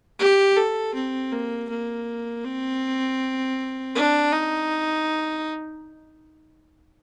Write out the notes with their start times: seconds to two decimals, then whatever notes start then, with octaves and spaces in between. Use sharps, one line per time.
0.19 G4
0.57 A4
0.95 C4
1.32 A#3
1.69 A#3
2.45 C4
3.95 D4
4.33 D#4